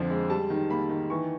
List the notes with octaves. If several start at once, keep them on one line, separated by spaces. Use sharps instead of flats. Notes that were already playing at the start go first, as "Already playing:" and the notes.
Already playing: F2 D3 F3 D4
G#3
G3 A5
D#3
A#3 B5
D#3
E3 C#6